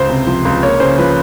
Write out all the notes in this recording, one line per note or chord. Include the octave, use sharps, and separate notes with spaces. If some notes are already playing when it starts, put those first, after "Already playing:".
Already playing: C#2 C5
C3
F3
C#2
A#3 C#5
C#3 C5
F3 B4